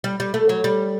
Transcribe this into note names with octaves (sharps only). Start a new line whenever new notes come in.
G3
G3
A3
F#3
G3